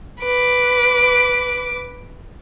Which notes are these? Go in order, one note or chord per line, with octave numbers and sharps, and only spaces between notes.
B4 D6